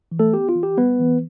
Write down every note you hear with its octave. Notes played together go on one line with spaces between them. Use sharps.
E3
A3 A4
B3 G4
F4
E3
G4
G3 B3 B4
E3